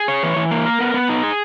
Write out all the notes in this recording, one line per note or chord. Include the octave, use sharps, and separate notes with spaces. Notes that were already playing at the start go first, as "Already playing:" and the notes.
Already playing: G#4
C#5
E3
E3
A#3
A#4
B3
B3
D#4
G#4